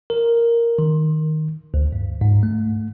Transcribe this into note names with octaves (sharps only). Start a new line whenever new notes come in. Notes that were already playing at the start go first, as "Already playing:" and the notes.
A#4
D#3
D2
G2
G#2
A3